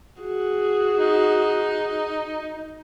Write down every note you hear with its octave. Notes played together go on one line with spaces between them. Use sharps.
F#4 G#4
D#4